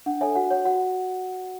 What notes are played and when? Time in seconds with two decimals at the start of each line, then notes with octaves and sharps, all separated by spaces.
0.06 D4 F#5
0.21 A4 C#5 E5 G#5
0.35 F#4 F#5
0.51 C#5 F#5
0.65 F#4 F#5